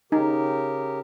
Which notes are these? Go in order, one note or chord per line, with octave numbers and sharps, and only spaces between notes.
C#3 D#4 G4 A#4